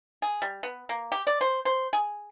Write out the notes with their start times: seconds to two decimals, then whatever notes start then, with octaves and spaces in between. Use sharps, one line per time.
0.22 G#4
0.42 G3
0.63 B3
0.89 A#3
1.12 G4
1.27 D5
1.41 C5
1.65 C5
1.93 G#4